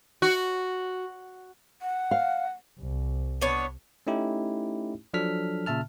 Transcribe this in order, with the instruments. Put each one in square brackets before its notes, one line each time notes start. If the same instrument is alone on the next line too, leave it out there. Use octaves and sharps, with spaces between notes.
[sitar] F#4
[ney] F#5
[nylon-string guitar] F5
[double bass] C2
[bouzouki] B3 D4 C#5
[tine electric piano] A3 C#4 D#4 E4 G4
F3 F#3 D4 A4 F6 B6
A#2 C#3 E5 A5 F6